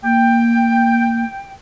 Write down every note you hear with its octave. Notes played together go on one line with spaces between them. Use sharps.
A#3 G5